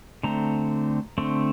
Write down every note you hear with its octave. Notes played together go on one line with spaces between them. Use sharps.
D3 A3 C4 A#5
D3 A3 C4